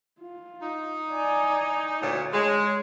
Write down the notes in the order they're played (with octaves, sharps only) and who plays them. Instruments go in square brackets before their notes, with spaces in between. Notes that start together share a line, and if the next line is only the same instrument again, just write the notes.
[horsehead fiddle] F4
[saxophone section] D#4
[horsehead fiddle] D5 G#5
[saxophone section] D2 A#2 [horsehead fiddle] C#5
[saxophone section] G#3 [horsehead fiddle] C#5